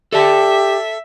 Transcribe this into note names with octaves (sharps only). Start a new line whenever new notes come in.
G4 A4 D5 E5 A5